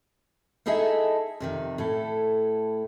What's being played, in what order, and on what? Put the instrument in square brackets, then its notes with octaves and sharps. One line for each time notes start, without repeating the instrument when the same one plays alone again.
[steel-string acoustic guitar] D#4 E4 G#4 A4 D#5 E5
F2 C3 D#3
A2 E4 A4